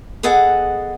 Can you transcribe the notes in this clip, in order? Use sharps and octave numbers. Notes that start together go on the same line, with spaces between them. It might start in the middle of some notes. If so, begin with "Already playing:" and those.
B3 G#4 A4 D#5 F#5